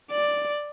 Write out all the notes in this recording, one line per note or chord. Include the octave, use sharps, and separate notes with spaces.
D5